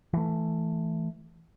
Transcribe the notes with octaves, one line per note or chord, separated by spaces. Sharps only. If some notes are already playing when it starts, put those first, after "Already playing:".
E3 A3